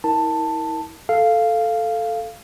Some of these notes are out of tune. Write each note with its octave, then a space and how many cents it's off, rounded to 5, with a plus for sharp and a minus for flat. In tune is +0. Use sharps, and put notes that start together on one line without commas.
E4 -35 A#4 +5 A5 +10
A4 +0 F5 -10